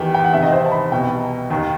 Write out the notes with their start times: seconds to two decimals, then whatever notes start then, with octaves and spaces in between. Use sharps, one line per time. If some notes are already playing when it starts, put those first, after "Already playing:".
Already playing: E2 D#3 G4
0.14 G5
0.24 F#5
0.33 E2 C3 D#3 E5
0.42 D#5
0.52 C5
0.66 A5
0.72 B5
0.91 C2 B2 G5
1.50 D#2 D#3